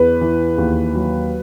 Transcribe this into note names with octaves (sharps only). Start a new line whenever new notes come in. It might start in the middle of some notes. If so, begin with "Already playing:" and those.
Already playing: E2 B4
E3
D#2
F#3